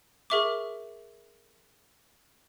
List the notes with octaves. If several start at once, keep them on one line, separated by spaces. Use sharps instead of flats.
G#4 A#4 E5 C#6 D6